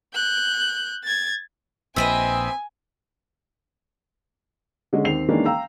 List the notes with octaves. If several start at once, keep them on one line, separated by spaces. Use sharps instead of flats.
F#6 G6
G#6 A6
A#1 A#2 C4 B4 D#5 E5 G#5
D3 G#3 C#4
D#2 C4 C7 F7
D#3 E3 G#3 A#3 C#4 D4
F5 G5 A#5 E6